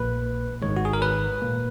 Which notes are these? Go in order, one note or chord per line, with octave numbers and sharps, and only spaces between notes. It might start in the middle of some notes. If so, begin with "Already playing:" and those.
Already playing: A#1 A#2 A#3 B4
G#1 G#2 D#3 G#3 C#5
F#4
G#4
A#4
B4
A#2 A#3